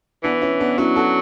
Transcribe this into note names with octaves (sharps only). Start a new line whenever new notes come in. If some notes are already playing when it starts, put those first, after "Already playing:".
E3 B3 D4
C#4 E4
B3 D4
F#3 C#4 E4
F#4 A4